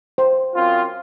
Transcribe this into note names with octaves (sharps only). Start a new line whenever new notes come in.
C5
F#2 C4 F4